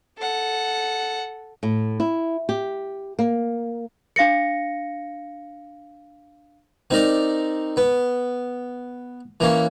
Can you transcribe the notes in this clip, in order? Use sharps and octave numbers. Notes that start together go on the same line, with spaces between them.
A4 F#5
A2
E4
G4
A#3
D4 F5 A#6 C#7
C4 D#4 A#4 D5
B3
E3 A#3 C#4